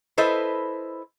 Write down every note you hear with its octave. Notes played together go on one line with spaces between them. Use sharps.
E4 A4 B4 C5 D#5